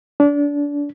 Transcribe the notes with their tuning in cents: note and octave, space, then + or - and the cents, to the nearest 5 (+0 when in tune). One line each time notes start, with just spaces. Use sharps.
D4 -25